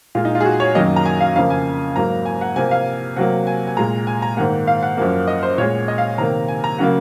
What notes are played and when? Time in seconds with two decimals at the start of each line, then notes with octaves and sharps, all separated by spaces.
0.15 A#2 G#3 F4
0.25 D#4
0.35 F4
0.41 G#4
0.45 F#4
0.60 C#5
0.75 F#2 D#3 F#3 A#3 D#5
0.96 A#5
1.05 G#5
1.20 F5
1.36 F2 C#3 F3 A#3 F5
1.50 G#5
1.96 G#2 F#3 A#3 A#5
2.26 G#5
2.41 F#5
2.56 C3 F3 A#3 G#5
2.71 F5
3.16 C3 F#3 A#3 F#5
3.47 G#5
3.67 G#5
3.77 A#2 G#3 A#5
4.07 G#5
4.22 A#5
4.37 G#2 D#3 A#3 F#5
4.67 F5
4.83 F#5
4.97 F#2 F3 A#3
5.27 D#5
5.43 C5
5.58 A#2 G#3 C#5
5.88 D#5
5.98 F5
6.18 C3 D#3 A#3 A#5
6.48 G#5
6.64 A#5
6.79 C#3 F#3 A#3 F#5